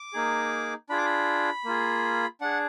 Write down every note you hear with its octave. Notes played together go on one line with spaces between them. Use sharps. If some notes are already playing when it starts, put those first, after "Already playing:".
Already playing: D6
A#3 D#4 G#4
D4 F4 G#4 B5
D6
B5
A#3 F4 G#4
D4 G#4 F#5